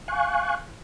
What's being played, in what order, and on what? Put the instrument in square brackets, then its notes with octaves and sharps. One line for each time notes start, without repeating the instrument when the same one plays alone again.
[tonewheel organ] F5 G#5 C#6 F#6